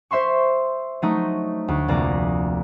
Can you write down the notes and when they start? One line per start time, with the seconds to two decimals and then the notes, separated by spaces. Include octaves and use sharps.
0.11 C5 E5 C6 C#6
1.02 F#3 A3 D#4
1.68 D2
1.88 F1 A#3 D5 A#5